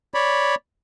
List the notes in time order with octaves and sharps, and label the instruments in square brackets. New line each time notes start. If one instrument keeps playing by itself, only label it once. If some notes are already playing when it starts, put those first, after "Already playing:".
[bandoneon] C#5 D5 B5